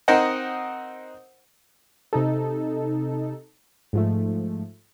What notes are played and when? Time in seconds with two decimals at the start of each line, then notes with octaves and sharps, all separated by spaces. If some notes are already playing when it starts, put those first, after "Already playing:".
0.08 C4 D#4 A#4 C5 D#5 F#5
2.13 C3 D#4 A4
3.93 G#2 F3 A3